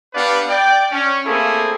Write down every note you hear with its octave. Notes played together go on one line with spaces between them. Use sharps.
B3 D4 G4 B4 D5 F5
D5 G5
C#4
A3 A#3 C4 E4 G#4 A4